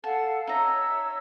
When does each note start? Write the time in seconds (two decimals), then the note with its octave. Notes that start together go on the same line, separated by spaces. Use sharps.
0.04 A4 F5 F#5 A5
0.47 D#4 C#5 E5 A#5 E6